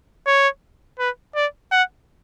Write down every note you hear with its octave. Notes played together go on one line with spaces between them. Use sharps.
C#5
B4
D5
F#5